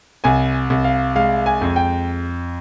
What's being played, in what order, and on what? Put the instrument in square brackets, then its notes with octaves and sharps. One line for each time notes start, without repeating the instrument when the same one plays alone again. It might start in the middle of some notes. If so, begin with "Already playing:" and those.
[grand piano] C2 G#5
C2
F5
G#3 F5
G#5
F2
G5